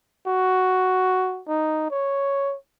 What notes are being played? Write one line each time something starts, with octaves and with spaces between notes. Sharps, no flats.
F#4
D#4
C#5